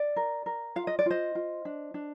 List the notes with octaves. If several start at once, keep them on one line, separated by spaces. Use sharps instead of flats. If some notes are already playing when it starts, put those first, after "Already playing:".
Already playing: D5
A#4
A#4
F4 F5
D#5
D5
F4 C5 D#5
F4
D4
D4